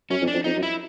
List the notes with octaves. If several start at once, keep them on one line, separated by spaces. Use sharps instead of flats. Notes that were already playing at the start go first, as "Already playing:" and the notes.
F#2 C#4
F2
D4
F2
F2 D#4
F#2
E4